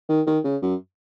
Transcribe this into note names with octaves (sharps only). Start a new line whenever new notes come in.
D#3
D#3
C#3
F#2